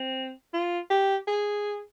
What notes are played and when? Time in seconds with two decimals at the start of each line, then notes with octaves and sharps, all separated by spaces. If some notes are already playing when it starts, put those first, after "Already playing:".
Already playing: C4
0.53 F4
0.90 G4
1.27 G#4